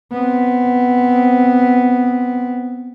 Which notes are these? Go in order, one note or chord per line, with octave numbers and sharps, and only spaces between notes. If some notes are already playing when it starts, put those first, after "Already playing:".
B3 C4